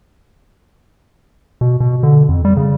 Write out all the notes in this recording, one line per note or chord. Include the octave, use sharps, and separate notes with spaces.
B2
B2
D3
F2
G3
C#3